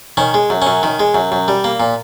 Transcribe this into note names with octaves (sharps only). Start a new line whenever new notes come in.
D#3 C#4
G#3
F#2
C#4
F#2
D#3
G#3
F#2
F#2
G3
A#3
A#2